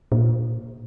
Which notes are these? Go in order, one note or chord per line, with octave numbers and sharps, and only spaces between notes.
A#2